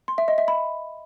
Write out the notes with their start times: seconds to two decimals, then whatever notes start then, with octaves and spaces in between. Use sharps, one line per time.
0.08 C6
0.18 E5
0.28 D#5
0.38 E5
0.48 B5